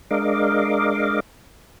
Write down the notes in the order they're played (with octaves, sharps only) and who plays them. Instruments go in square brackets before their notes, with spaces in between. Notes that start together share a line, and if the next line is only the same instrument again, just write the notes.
[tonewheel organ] G#3 D4 A#4 D#5 F5 D6